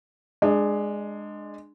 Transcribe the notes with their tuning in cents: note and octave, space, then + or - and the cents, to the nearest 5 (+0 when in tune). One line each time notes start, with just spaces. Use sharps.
G#3 +0 D4 +20